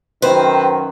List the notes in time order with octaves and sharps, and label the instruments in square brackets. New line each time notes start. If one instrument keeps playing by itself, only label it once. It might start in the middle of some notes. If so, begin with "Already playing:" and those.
[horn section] F#2 D#3 [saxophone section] C4 B4 [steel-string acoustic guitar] C5